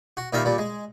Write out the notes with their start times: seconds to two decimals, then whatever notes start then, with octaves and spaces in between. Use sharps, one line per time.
0.17 F#4
0.33 A#2 D#3 G3 E5 F5 B5
0.45 A#2 G3
0.58 G#3